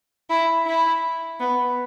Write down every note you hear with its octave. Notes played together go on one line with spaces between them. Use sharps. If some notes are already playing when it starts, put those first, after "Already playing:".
E4
E4
B3